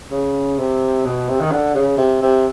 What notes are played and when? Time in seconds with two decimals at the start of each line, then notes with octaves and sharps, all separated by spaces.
0.11 C#3
0.58 C3
1.05 B2
1.29 C3
1.40 D#3
1.51 D3
1.74 C#3
1.97 C3
2.22 C3